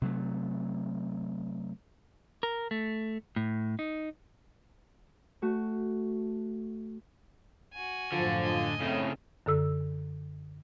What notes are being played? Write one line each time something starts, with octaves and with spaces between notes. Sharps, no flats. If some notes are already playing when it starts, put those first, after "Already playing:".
C3 F#3 A3
A#4
A3
A2
D#4
A3 F#4
F#4 G#5
F#2 A2 D3 F3
D#5 G#5
A2 C#3 C4 D#4
F#2 D3 A4 E6